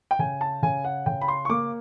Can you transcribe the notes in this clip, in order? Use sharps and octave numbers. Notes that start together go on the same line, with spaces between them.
G5
C#3 G#5
A5
C#3 G#5
F#5
C#3 G5
B5
C6
C#6
A#3 D6